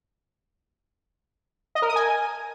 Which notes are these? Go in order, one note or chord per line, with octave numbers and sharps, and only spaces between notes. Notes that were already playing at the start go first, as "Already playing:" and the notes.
D#5
A#4
D#6
G#5